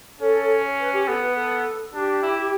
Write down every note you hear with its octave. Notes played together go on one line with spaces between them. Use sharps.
C#4 A4 C#5
B4
G4
B3 A4
B4
A4
D4 G4
E4